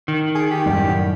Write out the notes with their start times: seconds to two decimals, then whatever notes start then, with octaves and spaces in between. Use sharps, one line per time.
0.08 D#3
0.35 G#4
0.51 G4
0.66 F#2 A2 G3